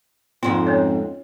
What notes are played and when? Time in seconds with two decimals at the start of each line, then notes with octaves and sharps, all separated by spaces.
0.43 F2 G#2 C4 F4
0.67 C#4 C#5